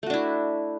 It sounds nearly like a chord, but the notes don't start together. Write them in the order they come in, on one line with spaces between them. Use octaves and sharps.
A3 F#4 D4 E4